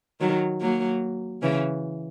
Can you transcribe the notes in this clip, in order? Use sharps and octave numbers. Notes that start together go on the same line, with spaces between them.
D#3 F#3
F#3 A#3
C#3 E3